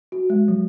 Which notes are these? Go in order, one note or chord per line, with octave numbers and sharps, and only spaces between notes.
F#4
G#3
F#3